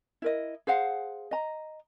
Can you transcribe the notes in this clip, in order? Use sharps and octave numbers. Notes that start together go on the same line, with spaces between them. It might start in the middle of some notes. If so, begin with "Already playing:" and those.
E4 A#4 D#5
G#4 C5 F5 F#5
D#5 A#5